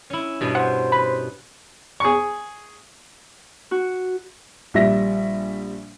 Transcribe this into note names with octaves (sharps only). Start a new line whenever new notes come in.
C#4 E4
G2 B2 C#4
C5 F#5
B4 B5
G#4 C#6
F#4
A#1 G3 E5 A#6